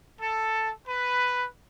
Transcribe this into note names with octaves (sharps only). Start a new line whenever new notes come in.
A4
B4